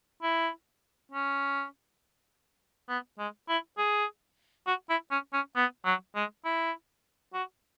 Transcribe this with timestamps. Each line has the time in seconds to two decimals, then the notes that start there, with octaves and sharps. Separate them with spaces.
0.23 E4
1.12 C#4
2.89 B3
3.19 G#3
3.49 E4
3.78 G#4
4.67 F#4
4.90 E4
5.11 C#4
5.33 C#4
5.56 B3
5.85 F#3
6.15 G#3
6.45 E4
7.34 F#4